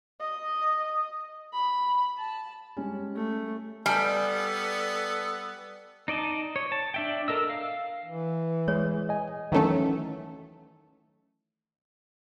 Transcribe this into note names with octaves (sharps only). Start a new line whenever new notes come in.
D#5
B5
A5
G3 G#3 C#4
A3
G3 B3 A4 G#5 A5 G6
D#4 D5 D#5 A5
C#5
A5
D4 E5 G5
A4 A#4 D#5 E6
F5
E3
G#3 C#5
D#5 G#5
D#3 E3 F#3 A3 C#4 A4